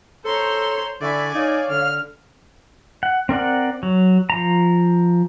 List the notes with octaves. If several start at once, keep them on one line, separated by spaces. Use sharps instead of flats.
A4 C5 C#5 A#5 C6
D3 E4 D5 E5 G#5 C#6
D#4 C#5 F5
D3 F6
F#5
C4 A#4 D5 F#5
F#3
F3 A#5